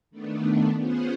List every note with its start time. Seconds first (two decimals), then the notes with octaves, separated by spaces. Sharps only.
0.11 D#3 A3 B3 D4
0.77 B3 C#4 F4 G#4 C5 F#5